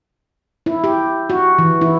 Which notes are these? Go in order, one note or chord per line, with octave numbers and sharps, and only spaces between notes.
E4
G4
F#4
E3
E4